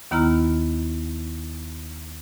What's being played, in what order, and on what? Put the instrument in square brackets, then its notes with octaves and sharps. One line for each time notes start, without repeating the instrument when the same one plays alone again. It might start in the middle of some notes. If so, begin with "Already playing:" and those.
[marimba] D#2 D#3 B3 E4 A#5 F6